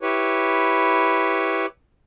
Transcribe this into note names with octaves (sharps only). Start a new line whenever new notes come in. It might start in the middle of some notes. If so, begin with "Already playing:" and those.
E4 G4 B4 C#5